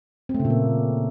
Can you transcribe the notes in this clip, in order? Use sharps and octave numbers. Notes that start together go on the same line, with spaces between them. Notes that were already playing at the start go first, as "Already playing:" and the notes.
C4
A3
C#3
A#2
A#3